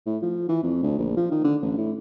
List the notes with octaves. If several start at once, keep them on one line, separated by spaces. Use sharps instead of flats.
A2
F3
E3
F2
D2
A#1
F3
D#3
D3
A1
A2